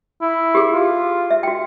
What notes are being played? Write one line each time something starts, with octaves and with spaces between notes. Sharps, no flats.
E4
G4 G#4
F4
E5
F#4 G5